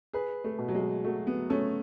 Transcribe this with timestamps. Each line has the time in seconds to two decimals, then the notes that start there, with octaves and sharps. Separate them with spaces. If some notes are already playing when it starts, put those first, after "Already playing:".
0.13 G#4 B4
0.44 A3
0.59 B2
0.68 F#3
0.75 G#3
1.04 F#3 A3
1.27 B3
1.50 A3 C#4